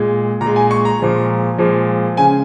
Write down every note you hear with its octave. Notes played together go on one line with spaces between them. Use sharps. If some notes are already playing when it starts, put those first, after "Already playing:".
Already playing: A#2 G#3
A#2 A#5
G#3
G#5
C#6
A#5
A#2 F3 G#3
A#2 F3 G#3
C#3 G#3 G#5